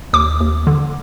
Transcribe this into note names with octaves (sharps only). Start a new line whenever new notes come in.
D#2 D6
D#2
D3